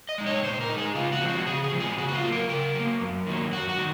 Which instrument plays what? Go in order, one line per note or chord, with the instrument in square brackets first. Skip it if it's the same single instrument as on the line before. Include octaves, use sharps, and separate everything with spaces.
[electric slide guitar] D#5
G#3 D#4
C#5
A#2 C5
A#4
G#3 D#4
G#4
C#3 F4
F#4
F3 G#3 C4
F#4
C#3 G#4
G#4
F3 G#3 C4
G#4
C#3 F#4
F#4
F4
F#3 A#3
A#4
C#3 A#4
F#3 A#3
F#2
D#3 F#3 A#3
F#2 F#4
F#4
D#3